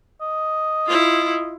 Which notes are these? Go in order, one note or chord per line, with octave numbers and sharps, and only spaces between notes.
D#5
E4 F4